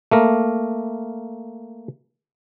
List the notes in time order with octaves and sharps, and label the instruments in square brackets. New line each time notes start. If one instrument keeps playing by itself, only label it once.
[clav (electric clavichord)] A3 A#3 A#4